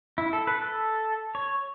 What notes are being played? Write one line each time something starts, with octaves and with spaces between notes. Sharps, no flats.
E4
A4
B4
A4
C#5